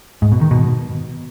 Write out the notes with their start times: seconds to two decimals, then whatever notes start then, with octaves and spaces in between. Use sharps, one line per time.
0.22 G#2
0.32 B2
0.41 D#3
0.51 B2